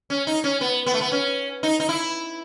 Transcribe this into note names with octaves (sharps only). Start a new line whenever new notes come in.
C#4
D#4
C#4
B3
B3
A3
B3
C#4
D#4
D#4
E4